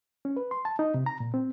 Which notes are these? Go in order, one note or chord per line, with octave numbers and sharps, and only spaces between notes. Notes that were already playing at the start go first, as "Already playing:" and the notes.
C#4
B4
C6
A5
D#4
C3
A#5
A#2
C4